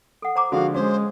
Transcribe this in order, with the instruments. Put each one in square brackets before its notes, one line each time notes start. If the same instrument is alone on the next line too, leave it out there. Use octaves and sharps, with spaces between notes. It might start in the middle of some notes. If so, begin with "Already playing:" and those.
[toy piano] A4 F#5
C5 A#5 D6
[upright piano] D3 F3 G#3 [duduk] F#4 [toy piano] A4 [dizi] F5
[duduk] G#3 [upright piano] C#4 [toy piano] F#4 [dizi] C5